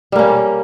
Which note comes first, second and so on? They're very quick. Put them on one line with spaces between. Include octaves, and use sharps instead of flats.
G3 A#3 C#4